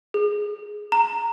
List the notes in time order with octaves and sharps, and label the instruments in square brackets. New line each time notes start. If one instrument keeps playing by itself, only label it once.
[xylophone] G#4
A#5